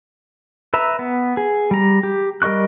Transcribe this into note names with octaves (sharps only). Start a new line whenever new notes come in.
B4 E5 A#5
B3
G#4
G3 A#5
G4
G3 A#4 D#5 C#6 F#6